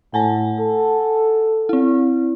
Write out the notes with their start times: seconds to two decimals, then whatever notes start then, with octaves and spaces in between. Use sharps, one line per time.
0.14 A2 F#5 G#5 A5
0.60 A4
1.69 C4 E4